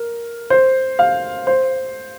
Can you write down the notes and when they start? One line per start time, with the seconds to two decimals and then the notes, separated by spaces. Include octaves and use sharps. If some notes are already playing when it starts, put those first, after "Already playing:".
Already playing: A#4
0.50 C5
0.99 F5
1.47 C5